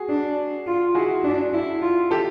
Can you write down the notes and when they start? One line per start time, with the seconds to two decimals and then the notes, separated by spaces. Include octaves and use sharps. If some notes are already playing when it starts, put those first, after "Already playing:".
Already playing: F#4 G#4
0.09 D4
0.67 F4
0.95 E4 F#4 G#4
1.24 D4
1.53 E4
1.81 F4
2.11 G4 A4